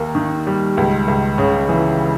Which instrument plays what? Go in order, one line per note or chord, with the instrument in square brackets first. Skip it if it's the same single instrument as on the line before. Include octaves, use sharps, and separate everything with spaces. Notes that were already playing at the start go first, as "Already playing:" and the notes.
Already playing: [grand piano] D#2 A#3
D#3
G3
C#2
C#2
C#3
E3